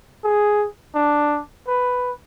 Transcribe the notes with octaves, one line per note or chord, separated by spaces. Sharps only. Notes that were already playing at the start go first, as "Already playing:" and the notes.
G#4
D4
B4